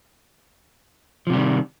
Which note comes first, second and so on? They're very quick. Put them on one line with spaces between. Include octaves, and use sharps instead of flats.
F3 C3 G3 D#3